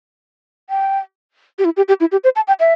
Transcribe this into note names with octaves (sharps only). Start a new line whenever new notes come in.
G5
G4
E4
G4
G4
E4
G4
C5
A5
G5
E5